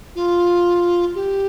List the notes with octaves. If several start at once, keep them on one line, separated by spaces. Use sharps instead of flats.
F4
G4